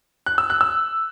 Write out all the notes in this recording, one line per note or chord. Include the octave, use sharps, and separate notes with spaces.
F#6
E6
F#6
E6